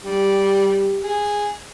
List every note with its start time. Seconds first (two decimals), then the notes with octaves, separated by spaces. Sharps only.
0.03 G3 G4
1.03 G#4